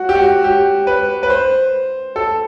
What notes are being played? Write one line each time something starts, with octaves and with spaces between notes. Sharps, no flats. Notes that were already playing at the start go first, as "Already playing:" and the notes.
Already playing: F#4
G4
F#4
G4
B4
B4
C5
A4